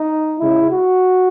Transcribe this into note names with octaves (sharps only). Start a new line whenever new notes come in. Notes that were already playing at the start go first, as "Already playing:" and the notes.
Already playing: D#4
C#3 G#3 E4
F#4